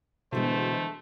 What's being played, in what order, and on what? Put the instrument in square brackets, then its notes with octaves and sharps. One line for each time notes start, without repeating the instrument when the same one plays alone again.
[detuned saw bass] B2 [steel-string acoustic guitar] D3 E3 G#3 [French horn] A3 [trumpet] C5